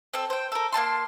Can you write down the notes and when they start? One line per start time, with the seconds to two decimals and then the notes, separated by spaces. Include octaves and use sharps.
0.14 C4 A4 E6
0.30 C5 G5
0.52 A4 A#4
0.72 A#3 E4 A5 C6